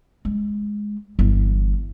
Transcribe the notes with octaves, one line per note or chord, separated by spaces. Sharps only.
G#3
G1 E3